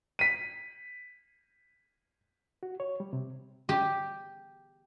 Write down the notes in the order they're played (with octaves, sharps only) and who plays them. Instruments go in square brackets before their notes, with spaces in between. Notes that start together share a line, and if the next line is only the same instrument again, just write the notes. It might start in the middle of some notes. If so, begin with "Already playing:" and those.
[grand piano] B6 D#7
[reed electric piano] F#4
C#5
G3
C3
[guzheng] G4